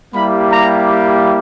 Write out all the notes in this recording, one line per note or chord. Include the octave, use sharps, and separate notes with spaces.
G3 A#3 E4 G4 B5
A#5